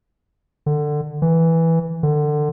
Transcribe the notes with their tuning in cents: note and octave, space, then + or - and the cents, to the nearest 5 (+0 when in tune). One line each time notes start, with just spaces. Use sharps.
D3 +20
E3 -5
D3 +25